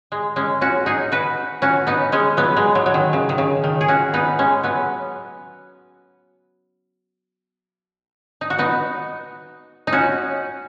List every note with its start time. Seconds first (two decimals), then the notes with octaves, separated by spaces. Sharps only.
0.12 G#3
0.36 G#3 C#4
0.61 C#4 F#4
0.86 D#4 G#4
1.12 F#4 B4
1.62 C#4 F#4
1.87 B3 D#4
2.12 G#3 C#4
2.37 F#3 B3
2.57 G#3
2.75 F#3
2.86 F#3
2.94 D#3
3.13 C#3
3.29 D#3
3.38 C#3
3.64 D#3
3.81 G#4
3.88 C#4 F#4
4.14 B3 D#4
4.39 G#3 C#4
4.63 F#3 B3
8.41 D#4
8.50 F#4
8.59 B3 D#4
9.87 D#4
9.92 C#4 F#4